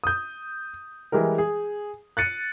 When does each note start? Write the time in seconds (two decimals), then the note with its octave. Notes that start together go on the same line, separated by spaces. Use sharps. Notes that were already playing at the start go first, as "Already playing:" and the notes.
0.04 D#6 G6
1.12 E3 G3 G#3 A#4
1.38 G#4
2.17 F#6 A6 C#7 D#7